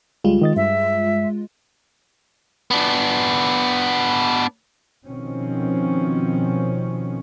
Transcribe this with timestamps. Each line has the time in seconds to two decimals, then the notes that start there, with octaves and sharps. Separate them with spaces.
0.24 D2 G3 G#3 F4
0.41 D#3 D#5 A6
0.56 G2 E5
2.71 B3 D4
5.06 B2 D#3 F3 C4 C#4